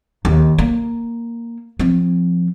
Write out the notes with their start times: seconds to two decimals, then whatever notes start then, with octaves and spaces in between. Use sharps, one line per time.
0.25 D#2
0.58 A#3
1.79 F3 C4